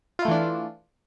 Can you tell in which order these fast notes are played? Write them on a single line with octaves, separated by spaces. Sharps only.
F4 E4 A3 E3 D4